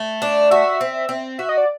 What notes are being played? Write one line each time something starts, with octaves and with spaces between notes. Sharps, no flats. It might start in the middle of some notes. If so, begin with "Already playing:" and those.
Already playing: A3
D4
F#4 E5
C4
C4
F#4 E5
D#5
D5